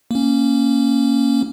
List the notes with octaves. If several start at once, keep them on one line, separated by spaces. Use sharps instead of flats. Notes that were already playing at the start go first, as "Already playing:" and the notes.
A#3 C#4